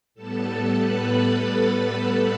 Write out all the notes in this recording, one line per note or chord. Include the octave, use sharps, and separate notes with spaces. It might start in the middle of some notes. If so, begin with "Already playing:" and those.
A2 G3 B3 A4 A5
B4 B5
A4 A5